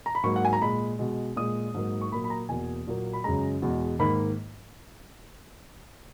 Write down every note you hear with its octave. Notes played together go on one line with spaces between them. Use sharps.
A#5
B5
G#2 F#3 A#3 C#6
F#5
G#5
A#5
A#2 G#3 B5
B2 G#3
A#2 G#3 D#6
G#2 F#3 A#3
C#6
A#2 F#3 A#3 B5
B5
A#5
E2 B2 A#3 G#5
A#2 F#3 A#3
B5
F#2 C#3 G#3 A#5
E2 B2 G#3
G#2 D#3 A#3 B5